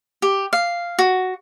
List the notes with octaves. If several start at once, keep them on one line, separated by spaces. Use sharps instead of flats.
G4
F5
F#4